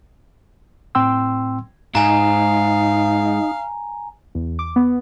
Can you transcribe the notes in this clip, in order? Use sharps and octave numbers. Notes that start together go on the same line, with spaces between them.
A2 C4 G5 C6 E6
G#2 D#4 F5 G#5 A#5
E2
D6
B3